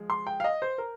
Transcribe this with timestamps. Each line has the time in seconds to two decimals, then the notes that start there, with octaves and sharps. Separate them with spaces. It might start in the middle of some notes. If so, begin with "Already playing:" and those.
Already playing: F3 G#3
0.10 C6
0.27 G5
0.40 F5
0.44 D#5
0.62 C5
0.78 A#4